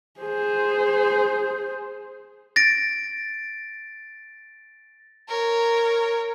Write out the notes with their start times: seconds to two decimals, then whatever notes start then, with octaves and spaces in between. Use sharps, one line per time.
0.20 G#4 C5
2.56 A6 A#6 D7
5.28 A#4 C#5